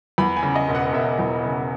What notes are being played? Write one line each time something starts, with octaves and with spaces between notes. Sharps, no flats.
E2 B5
G#5
C#3
D#5
E1
F#5
E1 E5
E2
C#3